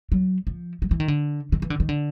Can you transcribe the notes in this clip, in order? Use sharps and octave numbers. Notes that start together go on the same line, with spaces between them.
F#3
F3
F#3
E3
D#3
D3
D#3
E3
D3
D#3
D3